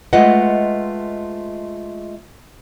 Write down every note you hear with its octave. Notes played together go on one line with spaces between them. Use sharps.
G#3 A3 F4 B4 D#5 F#5